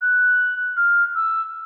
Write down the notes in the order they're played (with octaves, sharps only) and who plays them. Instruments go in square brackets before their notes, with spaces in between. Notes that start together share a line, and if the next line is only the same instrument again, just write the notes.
[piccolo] F#6
F6
E6